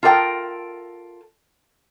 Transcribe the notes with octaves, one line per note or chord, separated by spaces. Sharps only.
F4 A4 A#4 D5 G5